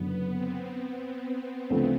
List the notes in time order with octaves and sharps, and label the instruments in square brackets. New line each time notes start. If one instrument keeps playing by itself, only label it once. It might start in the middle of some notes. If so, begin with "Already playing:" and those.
Already playing: [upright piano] F#1 F#2 D3 [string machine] B3
[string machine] C4
B3
[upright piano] D2 C#3 F3 A3 C4